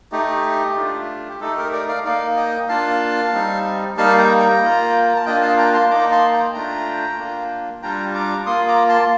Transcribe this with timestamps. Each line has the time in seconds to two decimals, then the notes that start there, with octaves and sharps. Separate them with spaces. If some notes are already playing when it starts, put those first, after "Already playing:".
0.12 A3 D#4 G4
0.77 A3 D4 F4
1.28 G4
1.41 A3 D#4 A4
1.57 G4 A#4
1.73 A#4 D5
1.88 D5 F5
2.05 A#3 D#4 D5 F5
2.37 D#5 G5
2.68 A#3 D4 F4 F5 A5
3.33 G3 C4 D#4
3.97 G3 A#3 D#4 F5 A5
4.18 G5 A#5
4.40 G5 A#5
4.62 A#3 F4
5.09 A#5
5.16 A5
5.25 A#3 D4 F4 D#5 G5
5.42 F5 A5
5.58 G5 A#5
5.74 A5 C6
5.85 C6
5.90 A#3 D#4 A#5 D6
6.12 A5 C6
6.33 G5 A#5
6.54 A3 D4 F4 G5 A#5
7.18 A#3 D4 F4
7.83 G3 D4 F4 G5 A#5
8.14 A#5 D6
8.46 A#3 F4 C6 D#6
8.68 A#5 D6
8.89 A5 C6